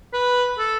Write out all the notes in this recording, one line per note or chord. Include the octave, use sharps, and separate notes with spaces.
B4
A4